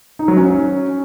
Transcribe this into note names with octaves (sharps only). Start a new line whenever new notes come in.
D#4
F#3
C#4